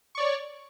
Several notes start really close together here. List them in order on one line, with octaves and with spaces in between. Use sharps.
C#6 D5 C#5